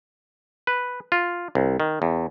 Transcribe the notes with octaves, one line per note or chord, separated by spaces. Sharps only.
B4
F4
C2
D#3
E2